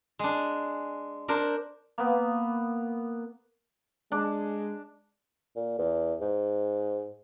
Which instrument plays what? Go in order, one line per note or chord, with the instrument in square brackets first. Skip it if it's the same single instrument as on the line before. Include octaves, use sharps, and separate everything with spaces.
[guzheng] G#3 D4
D4 A#4 C5
[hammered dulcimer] A#3 B3
[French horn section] G#3 [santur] D4
[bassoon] A#2
E2
G#2